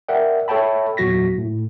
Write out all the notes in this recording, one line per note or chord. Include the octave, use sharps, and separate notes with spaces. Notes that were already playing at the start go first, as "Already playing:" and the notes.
A#4 D5 E5 F#5 G5
A4 C#5 E5 G5 A5 B5
E2 A#2 F#3 F#4 A#6 B6
A2